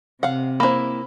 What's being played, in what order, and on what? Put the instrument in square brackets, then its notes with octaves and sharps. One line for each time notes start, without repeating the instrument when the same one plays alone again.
[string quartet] C3 [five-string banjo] F5 F#5
[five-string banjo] A#3 E4 [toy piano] C5 B5